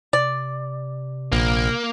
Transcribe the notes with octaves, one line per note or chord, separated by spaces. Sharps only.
C3 D5
A#1 A#3